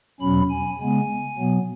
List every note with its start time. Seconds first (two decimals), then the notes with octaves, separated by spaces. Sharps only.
0.20 E2 B2 F#3 C#4 B5
0.50 G#5
0.79 C#3 G#3 B3 G#5
1.38 B2 F#3 B3